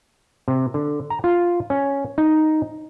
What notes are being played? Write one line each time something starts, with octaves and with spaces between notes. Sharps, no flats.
C3
D3
A#5
F4
C#4
D#4